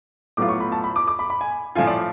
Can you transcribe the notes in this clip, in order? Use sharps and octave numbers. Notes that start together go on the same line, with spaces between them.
A2 F#3 B3 F4 D6
C#6
B5
A5
B5
D6
D6
B5
B5
G#5
A2 F3 A3 F4 G#5
D5